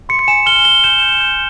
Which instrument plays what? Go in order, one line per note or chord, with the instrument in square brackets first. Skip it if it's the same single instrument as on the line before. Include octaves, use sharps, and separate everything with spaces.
[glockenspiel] C6 C#7
C#7
G#5 E7
F6 G7
C6 G7
G6 E7
G6
G6